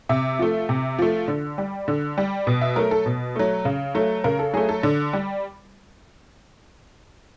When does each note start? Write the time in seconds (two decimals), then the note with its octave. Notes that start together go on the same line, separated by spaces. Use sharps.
0.09 C3 E5
0.39 F3 A3
0.69 C3
0.99 F3 A3
1.28 D3
1.58 G3
1.88 D3
2.18 G3
2.47 B2
2.61 E5
2.76 F#3 A3 A#4
2.91 A4
3.06 B2
3.36 F#3 A3
3.65 C#3
3.95 F#3 A3
4.24 C#3 A#4
4.39 A4
4.54 F#3 A3 G#4
4.69 A4
4.83 D3
5.13 G3